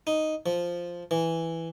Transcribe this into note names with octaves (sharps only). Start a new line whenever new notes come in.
D#4
F3
E3